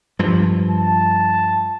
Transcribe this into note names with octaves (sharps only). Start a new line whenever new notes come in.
G2 F3
A5